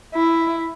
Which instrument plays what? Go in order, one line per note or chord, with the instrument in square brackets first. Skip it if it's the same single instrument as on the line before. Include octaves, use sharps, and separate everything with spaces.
[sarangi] E4